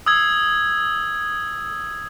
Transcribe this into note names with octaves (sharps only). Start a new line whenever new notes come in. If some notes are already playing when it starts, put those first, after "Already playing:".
D#6 E6 G#6